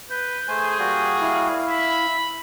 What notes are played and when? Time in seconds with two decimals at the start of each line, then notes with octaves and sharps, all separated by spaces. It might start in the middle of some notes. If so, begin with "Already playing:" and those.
0.10 B4 G6
0.48 A3 G#4 C5 G#5
0.79 G3 A#3 F#4
1.21 E4 F5
1.68 E5 B5